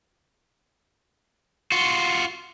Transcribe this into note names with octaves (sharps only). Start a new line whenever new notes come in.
F4 F#4